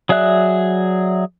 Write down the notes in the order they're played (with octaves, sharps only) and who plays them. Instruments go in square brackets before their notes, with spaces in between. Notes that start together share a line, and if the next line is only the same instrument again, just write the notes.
[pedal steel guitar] F#3 G#4 D5 E5 F#6